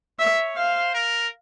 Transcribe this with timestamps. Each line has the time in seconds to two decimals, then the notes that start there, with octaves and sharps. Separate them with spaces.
0.19 C#5 E5
0.57 C5 F5
0.94 A#4